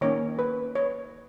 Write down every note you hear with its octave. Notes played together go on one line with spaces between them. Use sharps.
D#3 A#3 C#4 C#5
B4
C#5